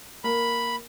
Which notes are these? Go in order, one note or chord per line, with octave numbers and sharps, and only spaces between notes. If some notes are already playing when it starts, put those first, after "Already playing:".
A#3 B5